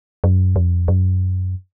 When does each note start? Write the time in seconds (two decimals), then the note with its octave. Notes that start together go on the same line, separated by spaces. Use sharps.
0.24 F#2
0.56 F2
0.88 F#2